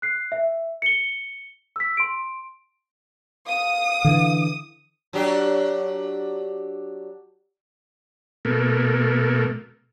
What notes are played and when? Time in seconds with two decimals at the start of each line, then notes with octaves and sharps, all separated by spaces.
0.02 F#6 C7
0.32 E5
0.82 C#7 G7
1.76 E6 B6
1.97 C6 D7
3.47 F5 D#6
4.05 D3 E3
5.13 F#3 D4 G4
8.45 B2 A3 A#3